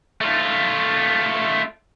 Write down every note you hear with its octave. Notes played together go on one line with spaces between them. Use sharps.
A3 F4